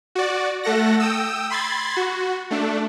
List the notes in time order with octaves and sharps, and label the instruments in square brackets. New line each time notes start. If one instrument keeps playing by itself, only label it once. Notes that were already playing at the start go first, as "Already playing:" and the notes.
[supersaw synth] F#4 D5
A3 A4 F#5 A#6
G5 D#6 E6
B5 C6 G#6 A6
F#4
A3 D4